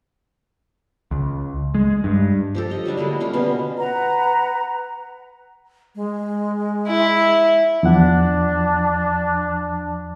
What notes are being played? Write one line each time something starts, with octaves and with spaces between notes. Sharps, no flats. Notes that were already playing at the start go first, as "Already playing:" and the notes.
C#2
G#3
G2
F3 G4 A4
C#5 D#5
F#3 G3 D4 E4
D3 G#3 A#3 A4
G3 C#4 F4
B2 D3 B3 C#4
B4 F#5 A#5
G#3
E4
E2 F3 D4 F#5